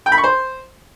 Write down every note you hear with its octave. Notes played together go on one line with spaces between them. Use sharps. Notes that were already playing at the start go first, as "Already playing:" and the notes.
G5
B5
C#6
C5